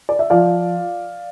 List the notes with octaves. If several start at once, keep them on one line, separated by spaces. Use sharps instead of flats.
D5
E5
F3 D5 F5